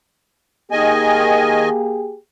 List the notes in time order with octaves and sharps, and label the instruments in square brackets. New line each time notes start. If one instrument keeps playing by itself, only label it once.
[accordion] D#3 D#5 G#5 [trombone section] A#3 G4 G#4